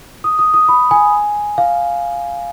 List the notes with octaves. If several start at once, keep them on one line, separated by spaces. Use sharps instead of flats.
D#6
D#6
D#6
B5
G#5
F5